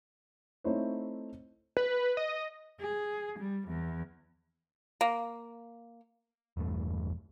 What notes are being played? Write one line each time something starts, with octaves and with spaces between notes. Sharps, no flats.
A3 C4 D#4 E4 C5 C#5
B4
D#5
G#4
G3
E2
A#3
E1 E2 G2 A3